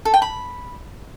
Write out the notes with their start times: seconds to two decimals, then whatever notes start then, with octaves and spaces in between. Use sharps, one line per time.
0.05 A4
0.14 G5
0.22 B5